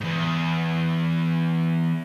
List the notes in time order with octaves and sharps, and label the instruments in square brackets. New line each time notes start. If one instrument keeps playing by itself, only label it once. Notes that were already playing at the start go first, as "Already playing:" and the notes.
[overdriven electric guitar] E2 G#2